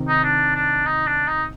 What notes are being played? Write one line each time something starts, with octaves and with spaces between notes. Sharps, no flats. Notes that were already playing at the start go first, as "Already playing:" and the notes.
Already playing: C3 D#3
D#4
D4
D4
D#4
D4
D#4